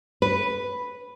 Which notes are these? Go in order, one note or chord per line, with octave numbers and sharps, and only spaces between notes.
B4